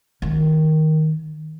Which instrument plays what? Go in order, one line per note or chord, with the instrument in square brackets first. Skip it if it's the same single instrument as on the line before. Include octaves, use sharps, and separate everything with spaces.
[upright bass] D#3